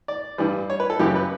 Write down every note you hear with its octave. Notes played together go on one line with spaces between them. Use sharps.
D5
G2 E3 G3
C#5
B4
A4
F#2 C#3 E3 G4
B4